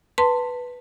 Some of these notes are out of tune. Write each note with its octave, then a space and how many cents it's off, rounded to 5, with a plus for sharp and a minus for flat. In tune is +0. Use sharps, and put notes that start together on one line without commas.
B4 +0 A5 +20 C6 -5